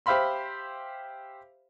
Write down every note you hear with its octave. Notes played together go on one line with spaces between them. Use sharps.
G4 C5 E5 F5 B5 C6